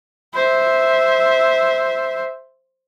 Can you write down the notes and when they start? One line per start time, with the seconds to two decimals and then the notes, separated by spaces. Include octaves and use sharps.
0.35 C5 E5